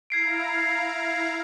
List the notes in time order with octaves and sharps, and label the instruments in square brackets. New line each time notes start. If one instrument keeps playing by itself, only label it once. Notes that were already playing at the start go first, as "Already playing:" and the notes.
[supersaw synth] E4 F5 A#5 [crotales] G#6 C7 D7